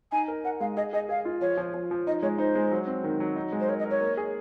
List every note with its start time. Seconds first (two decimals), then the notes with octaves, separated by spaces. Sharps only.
0.12 D#4 G#5
0.28 A#4
0.44 A#4 F#5
0.60 G#3 F5
0.77 G#4 D#5
0.93 G#4 D#5
1.09 G#4 F5
1.25 F4
1.41 F3 C#5
1.57 F3
1.74 F3
1.91 F3
2.07 D#4 D#5
2.22 G#3 C#5
2.38 D#4 C5
2.55 G#3
2.71 F#3
2.87 C4
3.04 D#3
3.20 F#3
3.36 D#4
3.52 G#3
3.60 C5
3.68 A#4 C#5
3.79 D#5
3.85 A#4
3.91 C#5
4.01 A#3
4.17 G#4